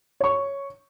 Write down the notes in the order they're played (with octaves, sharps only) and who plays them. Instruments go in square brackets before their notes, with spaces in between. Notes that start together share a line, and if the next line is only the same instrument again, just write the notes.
[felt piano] C#5 C#6